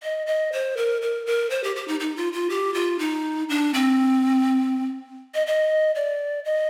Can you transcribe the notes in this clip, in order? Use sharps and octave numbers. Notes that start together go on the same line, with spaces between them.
D#5
D#5
C5
A#4
A#4
A#4
C5
G4
G4
D#4
D#4
F4
F4
G4
F4
D#4
D4
C4
D#5
D#5
D5
D#5